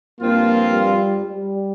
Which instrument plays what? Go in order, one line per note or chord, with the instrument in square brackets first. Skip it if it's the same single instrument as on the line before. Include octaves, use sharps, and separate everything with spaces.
[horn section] G2 F3 C4 F4 [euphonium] A#3
[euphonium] G3
G3